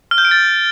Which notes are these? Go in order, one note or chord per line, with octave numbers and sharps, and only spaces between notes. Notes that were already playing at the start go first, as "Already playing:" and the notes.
F6
G6
D7
A6